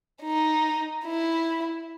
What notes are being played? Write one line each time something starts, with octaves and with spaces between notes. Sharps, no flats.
D#4
E4